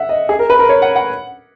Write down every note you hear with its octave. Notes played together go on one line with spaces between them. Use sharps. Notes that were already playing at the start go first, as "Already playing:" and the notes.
Already playing: E5 F#5
D#5
G#4
A#4
B4
A#4
C#5
F#5
F#5